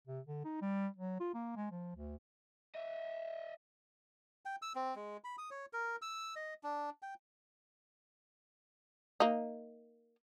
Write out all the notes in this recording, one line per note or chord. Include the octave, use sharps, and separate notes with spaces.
C3
D3
D#4
G3
F#3
F4
A#3
G#3
F3
D2
D#5 E5
G5
E6
C4
G#3
B5
D#6
C#5
A#4
E6
D#5
D4
G5
A#3 D#4